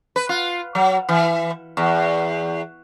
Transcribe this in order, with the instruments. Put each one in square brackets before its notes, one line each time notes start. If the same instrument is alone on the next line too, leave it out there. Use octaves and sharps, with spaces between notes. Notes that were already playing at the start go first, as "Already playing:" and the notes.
[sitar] B4
F4
F#3
E3
E2